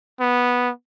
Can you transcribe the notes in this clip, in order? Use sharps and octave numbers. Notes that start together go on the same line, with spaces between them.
B3